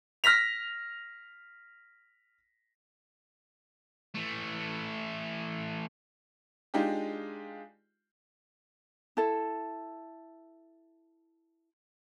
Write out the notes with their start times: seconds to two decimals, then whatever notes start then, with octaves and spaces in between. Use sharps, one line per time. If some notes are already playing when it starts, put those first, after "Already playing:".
0.24 F6 A#6 B6 F7
4.15 E3 A3
6.74 G#3 D4 D#4 F4 G4
9.17 E4 A4